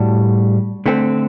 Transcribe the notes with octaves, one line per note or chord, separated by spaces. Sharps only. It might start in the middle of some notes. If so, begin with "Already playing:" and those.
Already playing: A2 G3 D4 F#4
D3 A3 C4